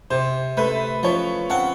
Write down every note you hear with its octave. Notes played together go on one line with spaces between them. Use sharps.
C3 C5
A3 B4
F3 C#5
C4 F#5